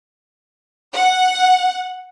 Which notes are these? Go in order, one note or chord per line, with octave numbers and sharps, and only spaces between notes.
F#5